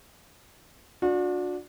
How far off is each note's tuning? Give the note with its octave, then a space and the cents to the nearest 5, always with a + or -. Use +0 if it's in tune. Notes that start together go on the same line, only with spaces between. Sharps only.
D4 +0 F#4 -40